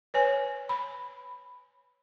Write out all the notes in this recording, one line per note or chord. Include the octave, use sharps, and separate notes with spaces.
B4 C#5 G#5
B5